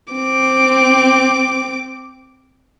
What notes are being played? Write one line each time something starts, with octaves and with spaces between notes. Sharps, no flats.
C4 D6